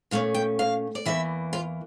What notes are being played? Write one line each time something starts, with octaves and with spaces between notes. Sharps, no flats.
A#2 A3 C#4 F5
G5
F5
D5
E2 E3 A#3 E5
F4